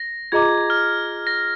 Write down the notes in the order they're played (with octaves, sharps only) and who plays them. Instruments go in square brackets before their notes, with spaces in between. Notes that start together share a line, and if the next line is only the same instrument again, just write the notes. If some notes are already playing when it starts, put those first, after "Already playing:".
Already playing: [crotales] A#6
[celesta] F4 G#4 D#5 A#5 D6 [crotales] G#6
[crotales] F6
A#6